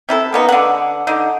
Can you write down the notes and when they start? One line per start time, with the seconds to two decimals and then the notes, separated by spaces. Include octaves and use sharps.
0.09 C3 E4 A4
0.33 A#3 B3 D#4
0.49 D3 F#5
1.07 D3 D#4